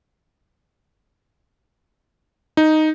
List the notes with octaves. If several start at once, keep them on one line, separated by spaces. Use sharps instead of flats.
D#4